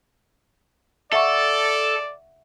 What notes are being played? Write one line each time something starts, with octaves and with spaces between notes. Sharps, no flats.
A4 D5 E5 F#5 C#6